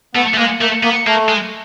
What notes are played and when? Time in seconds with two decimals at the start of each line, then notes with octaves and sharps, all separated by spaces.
0.15 A3 B3
0.34 A3
0.38 G#3 A#3
0.60 A3 A#3
0.83 A#3 B3
1.06 A3 A#3
1.29 G#3